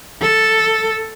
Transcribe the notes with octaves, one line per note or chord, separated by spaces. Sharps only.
A4